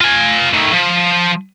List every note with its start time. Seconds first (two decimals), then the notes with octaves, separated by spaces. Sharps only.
0.01 F4 G#5
0.54 D#3 A3
0.73 F3